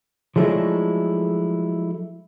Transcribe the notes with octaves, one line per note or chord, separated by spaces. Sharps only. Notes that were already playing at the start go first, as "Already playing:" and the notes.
F3 F#3 G#3 A3 D4 E4